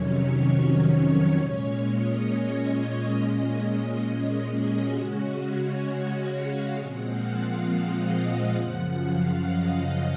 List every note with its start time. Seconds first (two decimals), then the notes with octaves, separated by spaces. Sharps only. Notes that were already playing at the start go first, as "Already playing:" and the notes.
Already playing: F2 C3 D#3 F#3 C#4 C#5
1.37 A#2 G#3 C#4 C#5
1.82 D#5
2.27 D#5
3.17 A#2 G#3 C#4
4.06 D#5
4.36 G#4
4.66 F#4
4.96 C#3 G#3 C#4 F#4
5.40 C#5
6.30 F5
6.75 A#2 F3 G#3 C4 F#5
7.05 F5
7.34 F5
7.65 D#5
8.10 F5
8.54 F#2 C#3 F3 F#5
8.99 F5
9.44 D#5